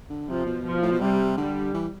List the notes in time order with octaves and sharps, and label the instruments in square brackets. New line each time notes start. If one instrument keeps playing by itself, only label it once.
[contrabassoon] D3
[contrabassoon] C3 [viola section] F3
[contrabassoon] B2
[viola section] F3
[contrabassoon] A2
B2
[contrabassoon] C3 [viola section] G3
[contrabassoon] D3 [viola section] G3
[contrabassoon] E3